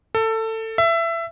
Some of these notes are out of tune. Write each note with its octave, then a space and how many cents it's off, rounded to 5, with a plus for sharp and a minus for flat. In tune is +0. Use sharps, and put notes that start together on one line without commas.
A4 +20
E5 +20